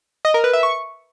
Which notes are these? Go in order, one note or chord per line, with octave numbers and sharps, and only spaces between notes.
D#5
A#4
B4
E5
C#6